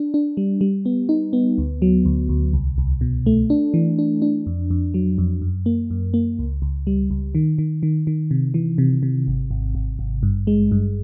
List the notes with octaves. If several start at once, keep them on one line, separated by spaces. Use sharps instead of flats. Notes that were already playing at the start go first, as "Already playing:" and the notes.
Already playing: D4
D4
G3
G3
B3
D#4
B3
D2
F#3
D2
D2
C2
C2
B2
A3
D4
E3
D4
D4
F2
F2
F#3
F2
F#2
A#3
F#2
A#3
C#2
C#2
G3
C#2
D#3
D#3
D#3
D#3
C3
E3
C3
C3
G#1
G#1
G#1
G#1
G2
G#3
G2